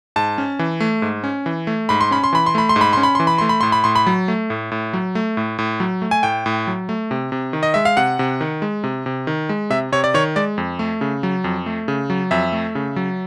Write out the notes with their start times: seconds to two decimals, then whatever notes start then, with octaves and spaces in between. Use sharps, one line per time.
0.16 G#2 A5
0.38 C#4
0.59 E3
0.80 A3
1.02 G#2
1.24 C#4
1.46 E3
1.67 A3
1.89 G#2 B5
2.01 C6
2.11 C#4 B5
2.24 C6
2.33 E3 B5
2.46 C6
2.55 A3 B5
2.69 C6
2.76 G#2
2.81 B5
2.93 C#4 C6
3.03 B5
3.15 E3 C6
3.27 B5
3.38 A3 C6
3.49 B5
3.61 A2 C6
3.72 B5
3.84 A2 C6
3.96 B5
4.07 F#3
4.28 A3
4.50 A2
4.72 A2
4.93 F#3
5.15 A3
5.37 A2
5.59 A2
5.80 F#3
6.02 A3
6.11 G#5
6.23 A2 G5
6.46 A2
6.67 F#3
6.89 A3
7.11 C3
7.32 C3
7.53 D#3
7.63 D#5
7.74 G#3 E5
7.85 F5
7.97 C3 F#5
8.19 C3
8.41 D#3
8.62 G#3
8.84 C3
9.06 C3
9.27 D#3
9.49 G#3
9.70 C3 E5
9.92 C3 C#5
10.04 D5
10.14 D#3 C#5
10.36 G#3 D5
10.58 F2
10.79 A3
11.01 C#3
11.23 F#3
11.44 F2
11.66 A3
11.88 C#3
12.10 F#3
12.31 F2 E5
12.52 A3
12.75 C#3
12.96 F#3